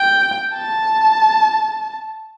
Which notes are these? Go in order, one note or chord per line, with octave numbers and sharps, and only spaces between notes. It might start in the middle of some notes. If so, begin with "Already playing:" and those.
Already playing: G5
A5